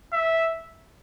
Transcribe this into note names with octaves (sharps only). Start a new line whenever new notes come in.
E5